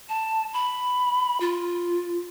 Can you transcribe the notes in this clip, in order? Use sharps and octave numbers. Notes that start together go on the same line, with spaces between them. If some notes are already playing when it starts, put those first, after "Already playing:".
A5
B5
F4